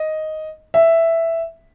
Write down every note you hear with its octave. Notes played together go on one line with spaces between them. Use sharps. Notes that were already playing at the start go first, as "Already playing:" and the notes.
Already playing: D#5
E5